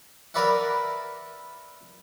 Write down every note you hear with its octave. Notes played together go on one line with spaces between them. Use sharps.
A#4 B4 D5 E5 F#5